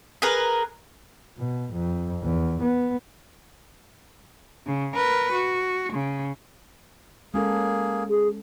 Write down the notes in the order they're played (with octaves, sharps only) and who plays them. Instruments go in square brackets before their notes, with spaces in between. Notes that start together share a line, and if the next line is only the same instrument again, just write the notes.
[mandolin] G#4 A#4 B4
[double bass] B2
F2
E2
B3
[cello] C#3
A#4 B4
F#4
C#3
[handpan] G#3 C#4 A4 [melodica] A#3 G#4
[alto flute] G#4